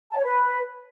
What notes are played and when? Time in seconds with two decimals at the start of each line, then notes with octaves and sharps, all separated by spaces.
0.11 A5
0.17 C#5
0.23 B4